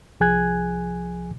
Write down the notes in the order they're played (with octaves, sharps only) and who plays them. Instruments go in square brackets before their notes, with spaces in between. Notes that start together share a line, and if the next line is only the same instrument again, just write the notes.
[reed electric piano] C2 F3 G#4 G#5 F#6 G#6